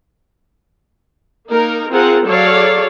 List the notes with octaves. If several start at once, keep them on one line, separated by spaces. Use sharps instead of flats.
A#3 D#4 A#4
C4 F4 G#4 A#4 F#5
F#3 G#4 A4 C#5 D5 F5